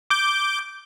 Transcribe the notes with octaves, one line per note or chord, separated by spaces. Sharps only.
D6 G6